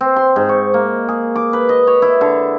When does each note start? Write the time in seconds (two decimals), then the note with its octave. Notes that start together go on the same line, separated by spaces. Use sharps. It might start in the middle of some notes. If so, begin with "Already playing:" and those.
0.01 C4
0.16 C6
0.36 G#2
0.49 C#6
0.74 A#3
1.08 G#4
1.36 D6
1.53 B4
1.69 D#5
1.87 C#5
2.02 E4
2.21 D3